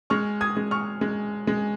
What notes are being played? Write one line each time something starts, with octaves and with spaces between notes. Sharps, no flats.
G#3 C#6 F6
D#6 G#6
G#3
C#6 F6
G#3
G#3